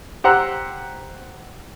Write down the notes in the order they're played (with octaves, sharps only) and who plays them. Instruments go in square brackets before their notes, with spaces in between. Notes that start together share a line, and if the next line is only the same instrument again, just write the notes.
[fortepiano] G4 C5 F#5 A#5 E6